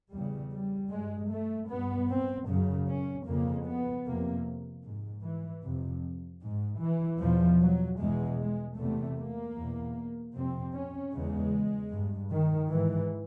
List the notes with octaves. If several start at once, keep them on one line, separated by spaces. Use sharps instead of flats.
E2 C#3 G3
G3
G2 G#3
A3
G2 B3
C4
F#2 C#3
C#4
F2 C#3 A#3
B3
F2 C3 A#3
G#2
E3
F2 C3
G#2
E3
E2 B2 F3
F#3
E2 B2 G#3
G#3
E2 C3 A3
A#3
E2 B2
F2 C3 C4
C#4
E2 C#3 G#3
G2
D#3
G#2 E3